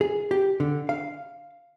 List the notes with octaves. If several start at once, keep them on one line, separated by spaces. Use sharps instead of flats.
G#4
G4
D3
F5